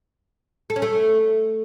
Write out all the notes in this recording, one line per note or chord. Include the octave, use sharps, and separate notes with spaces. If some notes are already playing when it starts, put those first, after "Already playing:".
A4
C#4
A3